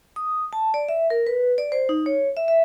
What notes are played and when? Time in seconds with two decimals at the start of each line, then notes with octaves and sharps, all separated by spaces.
0.16 D#6
0.53 A5
0.74 D5
0.89 E5
1.10 A#4
1.27 B4
1.58 D5
1.72 C5
1.89 D#4
2.06 C#5
2.37 E5
2.48 E5